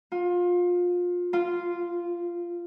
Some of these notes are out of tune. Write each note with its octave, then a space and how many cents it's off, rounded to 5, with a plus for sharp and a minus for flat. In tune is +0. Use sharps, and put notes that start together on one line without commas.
F4 +25
F4 -10